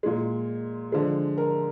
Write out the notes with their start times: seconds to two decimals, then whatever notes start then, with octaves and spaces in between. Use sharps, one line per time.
0.03 A#2 G#3
0.92 D3 F3 G#3
1.38 A#4